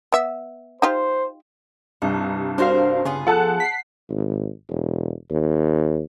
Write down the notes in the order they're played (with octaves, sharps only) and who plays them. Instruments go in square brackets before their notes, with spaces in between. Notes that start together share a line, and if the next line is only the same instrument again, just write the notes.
[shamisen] B3 E5
[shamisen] D#4 F4 G4 [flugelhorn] C5
[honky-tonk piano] C2 G2 [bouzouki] D#4
[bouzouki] C4 A#4 C5 [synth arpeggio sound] D4 F#4 F5
[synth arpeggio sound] C#3 [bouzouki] B3 F4 G#4
[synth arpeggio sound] F3 A4 [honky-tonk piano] F#5 A5 F#6
[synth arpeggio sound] B6 C7
[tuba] G#1
E1
D#2